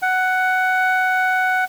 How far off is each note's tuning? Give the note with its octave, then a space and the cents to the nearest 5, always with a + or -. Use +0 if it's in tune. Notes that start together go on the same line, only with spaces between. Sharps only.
F#5 +10